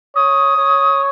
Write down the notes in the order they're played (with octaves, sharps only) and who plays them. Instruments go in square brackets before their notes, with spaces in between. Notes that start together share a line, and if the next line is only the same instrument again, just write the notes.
[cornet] C#5 [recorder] D#6
[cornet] C#5